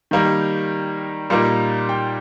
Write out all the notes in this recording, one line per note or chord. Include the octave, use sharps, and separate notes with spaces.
D#3 G3 A#3 D#4
A#2 G3 A#3 D#4
G5